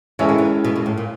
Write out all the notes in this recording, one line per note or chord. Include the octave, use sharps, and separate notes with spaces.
E3 G#3 C#4 E4 A4 C#5
D#3
E3
B2
A#2
A2
A#2